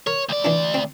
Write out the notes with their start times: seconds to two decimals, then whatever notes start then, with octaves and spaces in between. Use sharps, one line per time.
0.07 A#4 C#5
0.29 D2 D5
0.45 E3 B3 D4
0.74 C4